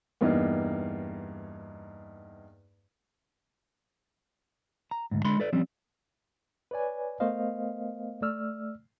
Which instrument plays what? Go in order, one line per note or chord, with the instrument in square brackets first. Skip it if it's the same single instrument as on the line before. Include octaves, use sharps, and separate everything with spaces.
[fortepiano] E2 G2 A#3 D#4
[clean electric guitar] A#5
D2 G#2
D3 G#3 B5 C6
A4 B4 D5
F3 G3 C4 C#4
[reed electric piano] B4 C#5 D5 G#5
A3 B3 A#4 C5 D#5 F5
A3 D5 E6 F6